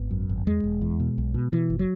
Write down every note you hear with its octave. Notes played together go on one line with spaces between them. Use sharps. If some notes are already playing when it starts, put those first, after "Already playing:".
Already playing: G#1 B3
F#2
G#1
E2 G#3
E1
E2
B2
B1
B2
B2 E3
F#1
F#3